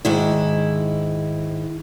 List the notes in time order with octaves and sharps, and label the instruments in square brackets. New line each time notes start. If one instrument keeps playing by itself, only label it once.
[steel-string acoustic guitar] G#2 D#3 E4